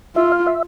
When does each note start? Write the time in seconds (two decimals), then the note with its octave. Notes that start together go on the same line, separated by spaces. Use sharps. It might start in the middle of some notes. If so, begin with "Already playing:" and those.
0.16 F4 E5
0.32 F5
0.47 E5